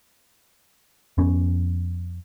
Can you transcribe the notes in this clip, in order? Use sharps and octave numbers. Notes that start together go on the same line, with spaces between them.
F2 B3 C#4